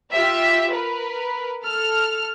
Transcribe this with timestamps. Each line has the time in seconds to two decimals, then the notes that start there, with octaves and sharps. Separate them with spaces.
0.12 F4 G4 E5
0.72 A#4 B4
1.63 A4 F6